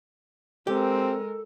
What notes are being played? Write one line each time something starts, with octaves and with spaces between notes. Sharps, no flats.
G#3 C4 G4 A4 A#4